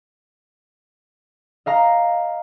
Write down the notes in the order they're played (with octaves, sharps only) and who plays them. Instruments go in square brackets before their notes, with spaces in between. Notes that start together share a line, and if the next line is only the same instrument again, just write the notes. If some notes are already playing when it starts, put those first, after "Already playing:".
[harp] D#5 F5 A#5